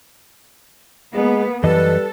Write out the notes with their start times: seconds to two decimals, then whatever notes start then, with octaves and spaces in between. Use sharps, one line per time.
1.14 G#3 A#3 B3
1.64 F#2 E3 G3 A4 B4 D#5